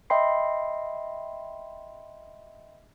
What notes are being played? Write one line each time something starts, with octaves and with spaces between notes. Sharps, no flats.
D#5 E5 G5 B5 C6 C7